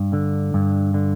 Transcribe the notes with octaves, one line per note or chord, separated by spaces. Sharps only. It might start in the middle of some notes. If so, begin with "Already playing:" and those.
Already playing: G2
D3
G2
D3